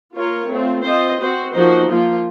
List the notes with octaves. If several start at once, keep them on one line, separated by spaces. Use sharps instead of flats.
A#3 F4 A#4 C#5
A3 C4 F4
C4 F4 C5 D#5
C4 F#4 C5
F3 A#3 D#4 F#4 C5
F3 A#3 F4